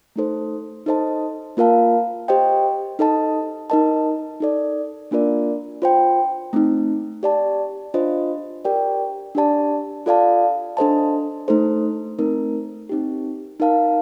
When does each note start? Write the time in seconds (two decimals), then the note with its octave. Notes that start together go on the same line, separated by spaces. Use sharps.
0.16 A3 D#4 A4 C5
0.86 D#4 A4 C5 D#5 A5
1.57 A#3 F4 A#4 F5 A5
2.28 G4 C5 D#5 G5
2.99 D#4 A4 D#5 A5
3.70 D#4 A#4 D#5 A5
4.40 D#4 A4 D5
5.11 A#3 D4 F4 A#4 D5
5.82 F4 C5 G5
6.53 A3 C4 D#4
7.23 G4 D5 A5
7.94 D4 F4 C5 D#5
8.65 G4 A#4 D5 G5
9.35 D4 G4 D5 A5
10.06 F4 A4 D5 F5 A5
10.77 D4 A4 C5 D#5 A5
11.48 A3 D#4 A4 C5
12.19 A3 C4 D#4 A#4
12.89 C4 D#4 G4
13.60 D#4 A#4 F5 A5